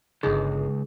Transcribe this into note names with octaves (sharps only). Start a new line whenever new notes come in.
G1 C#2 G#3 D#4 G#4